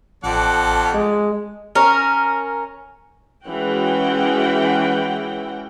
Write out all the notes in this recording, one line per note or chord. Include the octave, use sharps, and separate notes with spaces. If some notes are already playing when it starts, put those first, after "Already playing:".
A1 F2 A4 D5 F#5
G#3
C#4 A#4
E3 G#3 C#4 F#4 F#5 G5